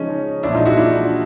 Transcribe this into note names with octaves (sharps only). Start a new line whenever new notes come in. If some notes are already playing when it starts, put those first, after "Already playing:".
Already playing: C#3 F3 G#3 C#4 D#4
A#2 F3 G#3 D4 E4
D#4 F4
E4 F#4
D4 E4